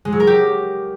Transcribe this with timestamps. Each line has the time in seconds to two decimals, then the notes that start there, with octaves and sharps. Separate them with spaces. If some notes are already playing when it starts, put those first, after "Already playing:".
0.05 G#3
0.12 F#3
0.20 A#4
0.27 G4